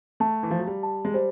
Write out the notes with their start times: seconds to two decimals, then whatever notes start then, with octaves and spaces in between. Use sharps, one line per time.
0.20 A3 A5
0.43 E3
0.51 F3 F5
0.59 F#3
0.67 G3
0.83 A5
1.05 G#3
1.14 G3 C5